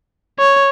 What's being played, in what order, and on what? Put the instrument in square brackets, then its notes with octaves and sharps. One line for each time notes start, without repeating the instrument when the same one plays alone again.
[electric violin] C#5